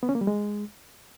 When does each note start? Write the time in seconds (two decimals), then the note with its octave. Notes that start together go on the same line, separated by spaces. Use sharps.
0.03 B3
0.09 C#4
0.15 A#3
0.21 G3
0.27 G#3